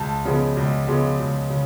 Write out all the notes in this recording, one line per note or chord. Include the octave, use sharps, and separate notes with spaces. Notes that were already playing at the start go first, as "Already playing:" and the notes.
Already playing: C#2 A5
C#3 F3 G#3 B3
C#2
C#3 F3 G#3 B3
C#2
C#3